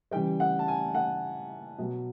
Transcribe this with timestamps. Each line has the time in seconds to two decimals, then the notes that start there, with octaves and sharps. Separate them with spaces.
0.11 C#3 E3 G3 G5
0.40 F#5
0.59 A5
0.68 G#5
0.95 F#5
1.78 B2 F#3